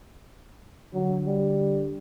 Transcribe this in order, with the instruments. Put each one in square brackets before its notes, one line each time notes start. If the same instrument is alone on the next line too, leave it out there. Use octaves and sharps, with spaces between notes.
[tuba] D3 [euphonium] F#3
[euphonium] G3